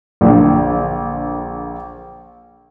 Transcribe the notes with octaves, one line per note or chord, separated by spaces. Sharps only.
A#1 A#2 D3